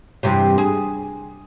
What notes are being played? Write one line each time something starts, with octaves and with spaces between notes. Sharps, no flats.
E2 G2 C3
G#4